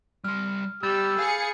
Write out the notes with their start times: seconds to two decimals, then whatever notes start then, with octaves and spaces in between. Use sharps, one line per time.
0.24 G3 C6 F6
0.83 G3 G4 B5 E6 G6 A6
1.19 G#4 F5 C#7